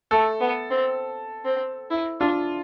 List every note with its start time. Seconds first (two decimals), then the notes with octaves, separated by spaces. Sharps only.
0.11 A3 A4
0.40 B3
0.70 C4
1.45 C4
1.90 E4
2.20 D4 F4